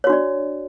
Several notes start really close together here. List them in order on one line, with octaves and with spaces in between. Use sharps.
C#5 F#4 D4 D5